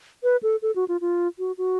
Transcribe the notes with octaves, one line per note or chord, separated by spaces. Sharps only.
B4
A4
A4
F#4
F4
F4
F#4
F#4